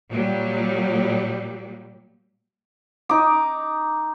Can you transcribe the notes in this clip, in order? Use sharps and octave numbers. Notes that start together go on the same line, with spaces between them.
A#2 F#3 G3
D#4 D6